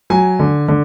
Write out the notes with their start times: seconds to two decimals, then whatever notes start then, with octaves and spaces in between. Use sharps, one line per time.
0.10 F#3 G#5
0.39 D3
0.68 D3